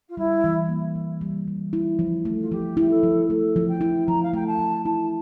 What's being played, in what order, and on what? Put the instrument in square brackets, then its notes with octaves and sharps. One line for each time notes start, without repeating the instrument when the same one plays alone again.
[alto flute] F4
[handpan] G3 [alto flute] E4
[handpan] E3
A#3
E3
G3
E3
E4
F3
A3
[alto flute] F4
[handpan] F3 [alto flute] G4
[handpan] E4 [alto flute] G4
[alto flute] A4
[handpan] F3
[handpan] A3 [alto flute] A4
[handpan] F3
[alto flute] G5
[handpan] E4
[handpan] F3 [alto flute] A#5
[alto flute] F5
[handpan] A3 [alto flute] G5
[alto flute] A5
[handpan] F3
[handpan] E4 [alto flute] A5